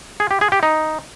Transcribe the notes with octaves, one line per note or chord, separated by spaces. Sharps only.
G#4
G4
G#4
G4
D#4